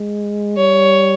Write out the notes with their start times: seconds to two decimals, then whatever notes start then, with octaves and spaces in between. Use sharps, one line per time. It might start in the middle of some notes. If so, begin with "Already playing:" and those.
Already playing: G#3
0.57 G3 C#5